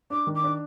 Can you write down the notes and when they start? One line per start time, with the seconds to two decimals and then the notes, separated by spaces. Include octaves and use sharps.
0.10 D4 D6
0.27 D#3
0.35 D6
0.44 D4